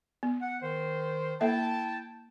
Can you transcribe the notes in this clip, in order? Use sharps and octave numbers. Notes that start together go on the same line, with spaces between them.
B3
F#5
D#3 C5
A#3 E4 A4 E5 G5 A5